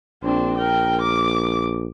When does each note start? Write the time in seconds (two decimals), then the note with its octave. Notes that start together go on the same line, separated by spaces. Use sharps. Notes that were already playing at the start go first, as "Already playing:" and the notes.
0.24 A#1 C4 D4
0.57 A#4 G5
1.01 D6